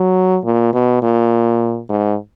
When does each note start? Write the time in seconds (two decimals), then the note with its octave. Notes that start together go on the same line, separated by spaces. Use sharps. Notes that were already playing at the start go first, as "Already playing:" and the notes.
Already playing: F#3
0.44 A#2
0.73 B2
1.03 A#2
1.90 G#2